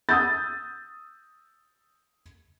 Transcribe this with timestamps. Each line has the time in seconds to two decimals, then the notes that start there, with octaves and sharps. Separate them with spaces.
0.09 D#6 E6 G6 A6